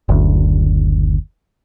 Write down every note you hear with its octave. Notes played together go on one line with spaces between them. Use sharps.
F#1 D2